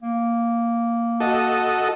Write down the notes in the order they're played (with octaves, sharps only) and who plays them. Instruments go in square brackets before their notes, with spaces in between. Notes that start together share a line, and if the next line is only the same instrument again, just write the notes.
[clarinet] A#3
[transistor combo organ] F#4 A4 D#5